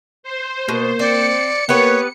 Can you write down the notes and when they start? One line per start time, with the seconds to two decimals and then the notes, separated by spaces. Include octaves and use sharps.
0.23 C5
0.69 B2 A#3
0.99 C4 D5 C#7
1.69 A#3 B3 G4 B4 C#5